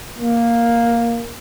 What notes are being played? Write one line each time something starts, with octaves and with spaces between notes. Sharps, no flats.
A#3